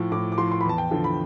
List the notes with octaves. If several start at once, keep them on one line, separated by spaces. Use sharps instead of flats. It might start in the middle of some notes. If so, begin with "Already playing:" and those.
Already playing: A2 F3
A2 D6
D6
F3 C6
C6
B5
E2 A5
G5
D3 F3 A5
B5